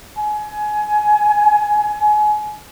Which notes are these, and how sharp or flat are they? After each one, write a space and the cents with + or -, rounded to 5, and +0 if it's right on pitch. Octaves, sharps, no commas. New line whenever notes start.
G#5 +25